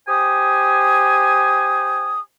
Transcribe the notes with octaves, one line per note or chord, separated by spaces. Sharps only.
G4 C5 G#5 D#6